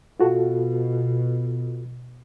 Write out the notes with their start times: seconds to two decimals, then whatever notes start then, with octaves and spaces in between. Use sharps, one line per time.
0.20 B2 F4 F#4 A4